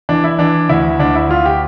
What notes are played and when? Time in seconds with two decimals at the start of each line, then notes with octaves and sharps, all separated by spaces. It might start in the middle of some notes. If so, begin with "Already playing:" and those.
0.09 E3 D4
0.24 E4
0.39 E3 D4
0.69 D2 E4
1.00 D2 D4
1.15 E4
1.29 D2 F4
1.46 G4